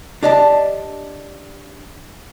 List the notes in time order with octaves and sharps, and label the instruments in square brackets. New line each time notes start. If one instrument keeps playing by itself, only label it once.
[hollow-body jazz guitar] D4 G4 D5 D#5 A5